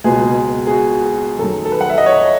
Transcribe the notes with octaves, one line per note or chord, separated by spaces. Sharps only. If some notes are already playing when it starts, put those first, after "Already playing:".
C#2 B2 G#3 G#4
G#4
F#4
G#4
F#2 D#3 F#3 A4
A4
B4
F#5
E5
D#5
C#5